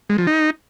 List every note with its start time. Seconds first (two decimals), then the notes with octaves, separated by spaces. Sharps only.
0.10 G#3
0.18 F3
0.27 D#4